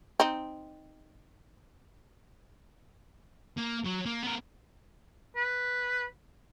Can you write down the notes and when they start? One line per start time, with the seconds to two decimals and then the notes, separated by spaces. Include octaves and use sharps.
0.20 C4 D#4
3.58 A#3
3.86 F#3
4.06 A#3
4.23 B3 A#4
5.36 B4